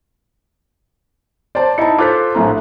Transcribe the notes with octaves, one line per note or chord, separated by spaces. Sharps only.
C5 D5 A5
D#4 E4 A5 C#7
F4 A4 C5 D6 F#6 B6
A#1 A2 A#5